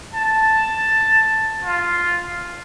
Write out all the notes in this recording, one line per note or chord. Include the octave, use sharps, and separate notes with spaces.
A5
F4